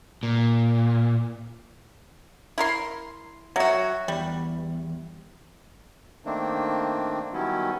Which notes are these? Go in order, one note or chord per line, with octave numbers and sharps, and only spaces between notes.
A#2
E4 A#4 C6
F#3 F#4 C#5 E5
E2 G3
D#3 A3 A#3 C4 D4
D#3 F#3 G3 B3 C#4 E4